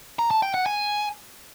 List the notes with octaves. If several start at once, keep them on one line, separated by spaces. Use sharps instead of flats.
A#5
A5
G5
F#5
G#5